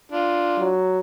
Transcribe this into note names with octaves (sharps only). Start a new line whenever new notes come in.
D4 F4
F#3